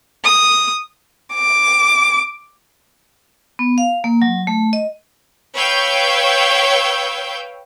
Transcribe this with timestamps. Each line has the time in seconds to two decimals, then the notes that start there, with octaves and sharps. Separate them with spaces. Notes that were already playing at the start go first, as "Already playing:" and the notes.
0.24 D#6
1.34 D6
3.59 B3
3.78 F5
4.04 A#3
4.22 F#3
4.47 A3
4.73 D#5
5.55 B4 C#5 F5 G5 E6 G6